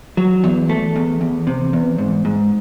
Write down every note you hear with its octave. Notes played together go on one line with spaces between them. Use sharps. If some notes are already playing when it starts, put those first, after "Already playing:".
F#3
E2
A3
E2
E2
C3
E2
G#2
G#2